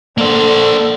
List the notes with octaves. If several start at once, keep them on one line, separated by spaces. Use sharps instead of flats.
D3 A#3 C5